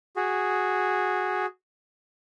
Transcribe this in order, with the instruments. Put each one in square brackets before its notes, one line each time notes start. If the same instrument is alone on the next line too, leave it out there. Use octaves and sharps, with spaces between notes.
[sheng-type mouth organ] F#4 G#4